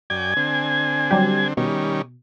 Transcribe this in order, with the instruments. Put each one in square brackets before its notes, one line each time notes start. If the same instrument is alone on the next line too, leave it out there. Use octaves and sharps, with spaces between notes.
[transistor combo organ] F#2 D5 G5 [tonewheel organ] G#5 G#6
[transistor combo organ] D3 C4
[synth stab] F#3 G3 G4
[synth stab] B2 [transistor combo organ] D#3 G3 C#4